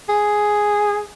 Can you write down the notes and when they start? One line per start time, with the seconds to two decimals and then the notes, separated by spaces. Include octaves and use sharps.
0.09 G#4